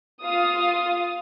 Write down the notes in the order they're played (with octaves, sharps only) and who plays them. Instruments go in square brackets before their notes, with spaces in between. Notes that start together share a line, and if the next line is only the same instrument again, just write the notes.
[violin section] F4 F5 D#6